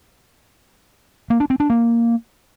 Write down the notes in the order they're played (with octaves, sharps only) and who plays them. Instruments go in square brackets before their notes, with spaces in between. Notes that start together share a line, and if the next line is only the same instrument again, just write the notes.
[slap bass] A#3
D4
C4
D4
A#3